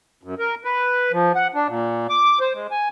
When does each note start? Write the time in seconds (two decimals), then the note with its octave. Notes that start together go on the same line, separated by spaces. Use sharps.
0.23 F#2
0.39 A#4
0.64 B4
1.12 F3
1.35 F#5
1.54 D4
1.67 A#2
2.10 D6
2.40 C5
2.54 G#3
2.71 G#5